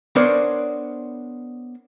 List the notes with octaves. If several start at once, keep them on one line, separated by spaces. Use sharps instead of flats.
B3 D4 A#4 C5 C#5